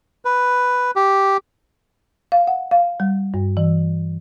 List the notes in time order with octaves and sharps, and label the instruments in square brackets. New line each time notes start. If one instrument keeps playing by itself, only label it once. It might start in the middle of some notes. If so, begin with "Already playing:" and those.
[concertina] B4
G4
[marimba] F5
F#5
F5
G3
G2
E3